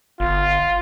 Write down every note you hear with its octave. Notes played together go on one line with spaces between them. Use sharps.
G1 F4